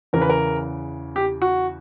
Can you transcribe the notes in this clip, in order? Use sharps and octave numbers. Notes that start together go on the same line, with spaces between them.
E2 C#3 E3 A#4
B4
A#4
G4
F#4